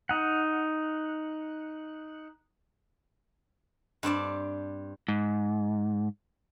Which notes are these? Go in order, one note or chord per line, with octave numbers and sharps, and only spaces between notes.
D#4 F#5
G2 C4 D5 A5
G#2